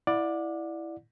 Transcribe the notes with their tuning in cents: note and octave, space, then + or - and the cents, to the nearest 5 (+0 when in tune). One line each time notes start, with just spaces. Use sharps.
E4 +0 D5 +10 F#5 -35